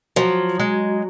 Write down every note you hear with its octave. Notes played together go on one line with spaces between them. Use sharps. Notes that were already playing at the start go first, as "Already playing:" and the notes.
F3 F#3
G#3